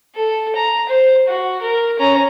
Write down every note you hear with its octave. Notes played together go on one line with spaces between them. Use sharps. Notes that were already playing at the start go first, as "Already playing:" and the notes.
A4
A#5
C5
F#4
A#4
C#4 A#5